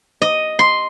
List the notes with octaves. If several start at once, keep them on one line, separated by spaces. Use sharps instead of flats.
D#5
C6